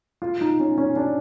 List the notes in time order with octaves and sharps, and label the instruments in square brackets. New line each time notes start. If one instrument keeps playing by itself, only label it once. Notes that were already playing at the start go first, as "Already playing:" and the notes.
[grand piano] F4
D#4
C#4
C#4
D4